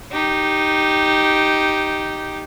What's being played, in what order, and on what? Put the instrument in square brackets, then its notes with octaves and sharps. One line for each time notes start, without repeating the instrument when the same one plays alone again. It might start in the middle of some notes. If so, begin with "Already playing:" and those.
[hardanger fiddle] D#4 G4